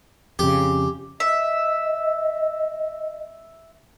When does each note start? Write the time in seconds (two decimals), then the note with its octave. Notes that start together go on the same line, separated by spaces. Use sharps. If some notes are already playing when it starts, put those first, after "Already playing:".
0.39 F2 C#3 G4
1.20 D#5 E5